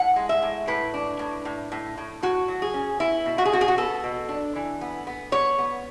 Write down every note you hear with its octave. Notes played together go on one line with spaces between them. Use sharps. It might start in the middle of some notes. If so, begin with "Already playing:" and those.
Already playing: A2 F#5
G#3
E5
A2
A2 B4
D4
A2
A2
A2
A2
A2 F#4
F#3
G#4
C#4
B3 E4
B2
F#4
G#4
B2 F#4
G#4
F#4
B3 A4
B2
D4
E3
B3
B3
B3 C#5
B3